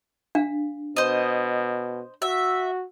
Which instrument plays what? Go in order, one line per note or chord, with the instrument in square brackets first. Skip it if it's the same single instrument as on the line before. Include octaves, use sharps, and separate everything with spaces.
[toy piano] D4 F5
[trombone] B2 [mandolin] C5 D#5
[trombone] F#4 [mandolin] E5